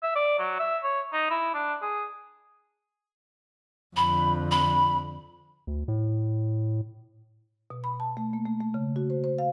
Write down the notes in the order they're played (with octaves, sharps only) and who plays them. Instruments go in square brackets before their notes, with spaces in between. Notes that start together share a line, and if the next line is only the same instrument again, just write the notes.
[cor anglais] E5
D5
F#3
E5
C#5
D#4
E4
D4
G#4
[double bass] F2 D3 [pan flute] B5
[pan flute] B5
[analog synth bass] D2
A2
[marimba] B2
B5
A5
A3
A#3
A3
A3
C#3
F#4
C5
C5
F5